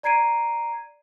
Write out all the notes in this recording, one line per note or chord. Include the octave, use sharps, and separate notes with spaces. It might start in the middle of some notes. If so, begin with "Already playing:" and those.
D5 A#5 G#6 C7 D7 D#7